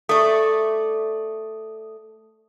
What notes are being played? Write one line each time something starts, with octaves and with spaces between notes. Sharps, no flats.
A3 D5 D#6